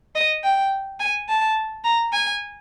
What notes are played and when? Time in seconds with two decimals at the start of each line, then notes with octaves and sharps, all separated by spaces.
0.16 D#5
0.44 G5
1.00 G#5
1.29 A5
1.85 A#5
2.13 G#5